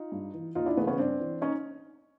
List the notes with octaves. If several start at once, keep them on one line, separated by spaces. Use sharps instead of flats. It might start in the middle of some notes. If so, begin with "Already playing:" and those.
Already playing: D#4 F4
G2
E3
D#2 D#4 F4
D4 E4
C#3 E3 A3 B3
B3 C#4
G2 C4 D4
E3
C#4 D#4